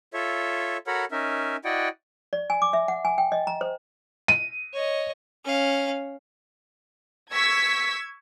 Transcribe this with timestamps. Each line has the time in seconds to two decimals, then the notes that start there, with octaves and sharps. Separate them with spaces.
0.14 F4 A4 C#5 E5
0.87 F#4 A4 A#4 C#5 F#5 B5
1.11 C#4 D#4 A#4 E5
1.65 E4 F#4 D5 D#5 F#5 G5
2.33 D5
2.50 G#5
2.62 D6
2.73 E5
2.88 F#5
3.05 G#5
3.18 G5
3.32 D#5
3.47 A#5
3.61 C5
4.28 D#7
4.74 C#5 D#5
5.45 C#4 F5
7.31 C#6 E6 G#6 B6